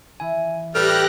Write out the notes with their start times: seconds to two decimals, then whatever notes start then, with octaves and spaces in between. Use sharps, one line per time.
0.20 E3 E4 G#5
0.75 A2 G3 G4 A4 B4 F6 F#6 A#6